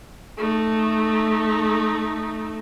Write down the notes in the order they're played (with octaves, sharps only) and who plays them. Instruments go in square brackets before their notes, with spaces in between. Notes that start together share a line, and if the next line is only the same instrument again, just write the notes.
[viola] A3 D#4